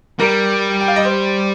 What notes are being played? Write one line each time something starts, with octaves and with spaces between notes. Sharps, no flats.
G3 A#4
G5
F5
D#5
C5